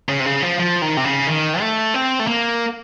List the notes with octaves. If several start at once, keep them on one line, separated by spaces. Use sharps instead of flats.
C#3
C3
C#3
F3
F3
D#3
C3
C#3
D#3
A3
C4
A3
A#3